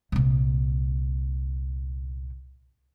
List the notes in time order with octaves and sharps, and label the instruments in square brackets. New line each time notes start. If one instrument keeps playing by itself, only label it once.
[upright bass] C2 A#2